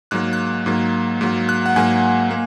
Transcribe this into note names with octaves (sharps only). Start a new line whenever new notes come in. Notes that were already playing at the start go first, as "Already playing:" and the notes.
G#2 F#3 A#3 F#6
F#6
G#2 F#3 A#3
G#2 F#3 A#3
F#6
F#5
G#2 F#3 A#3 G#5
A#3